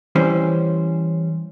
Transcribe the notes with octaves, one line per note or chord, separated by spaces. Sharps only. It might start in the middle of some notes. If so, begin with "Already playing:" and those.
E3 G3 C#4 C5